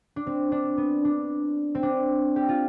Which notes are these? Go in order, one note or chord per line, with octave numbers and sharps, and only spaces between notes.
D4
C4
D4
B3
D4
C4
D4
G4
F4